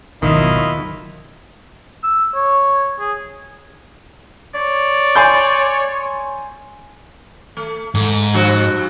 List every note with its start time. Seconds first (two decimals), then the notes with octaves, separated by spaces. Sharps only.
0.22 G#1 D#2 B2 D#3 F#3 E4 F4 D#5
2.03 E6
2.35 C#5
3.00 G#4
4.55 C#5 D5
5.15 G#5 C6 G6
7.57 A3
7.95 G#2 A3
8.34 G2 F3 F#4